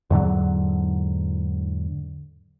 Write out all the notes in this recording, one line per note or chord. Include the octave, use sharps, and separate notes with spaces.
E2 G#2 D3 F#3